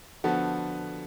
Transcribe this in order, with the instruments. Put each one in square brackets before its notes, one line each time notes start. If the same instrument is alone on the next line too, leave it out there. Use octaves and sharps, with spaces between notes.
[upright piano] D3 F3 B3 F#4 A4